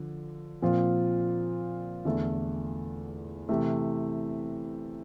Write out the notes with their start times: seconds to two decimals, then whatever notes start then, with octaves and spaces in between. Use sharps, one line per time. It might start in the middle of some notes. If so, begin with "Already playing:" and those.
Already playing: D3 F3
0.62 A#2 F3 C4 F4
2.05 E2 D3 A3 E4 A4
3.49 C3 E3 A3